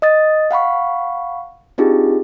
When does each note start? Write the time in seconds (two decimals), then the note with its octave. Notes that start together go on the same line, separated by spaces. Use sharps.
0.02 D#5 D#6 A6
0.51 F5 F#5 B5 C#6
1.78 C4 D4 D#4 F4 G4 G#4